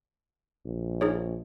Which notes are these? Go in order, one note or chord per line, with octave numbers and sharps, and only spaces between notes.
A#1
D#4 G#4 C#5